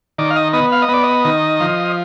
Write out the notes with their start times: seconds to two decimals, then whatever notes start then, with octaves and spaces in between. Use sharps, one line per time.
0.18 D#3 D5
0.30 F5
0.36 D#5
0.53 B3 D#5
0.72 F5
0.82 D#5
0.89 B3 D5
1.03 D#5
1.25 D#3
1.60 F3